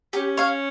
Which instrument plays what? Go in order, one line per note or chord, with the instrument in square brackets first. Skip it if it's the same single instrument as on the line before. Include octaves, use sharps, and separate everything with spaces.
[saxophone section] C#4 [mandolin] G4
[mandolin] C#5 F5